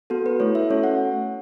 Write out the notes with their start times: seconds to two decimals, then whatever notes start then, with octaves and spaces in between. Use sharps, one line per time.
0.10 B3 F#4 A4
0.26 B4
0.40 A3 E4 A4 C#5
0.55 E5
0.70 A3 C#4 F#4 A4 C#5
0.84 F#5